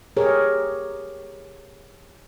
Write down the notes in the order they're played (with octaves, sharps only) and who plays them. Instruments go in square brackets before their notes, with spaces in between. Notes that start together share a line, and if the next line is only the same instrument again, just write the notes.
[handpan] G4 G#4 A#4 C#5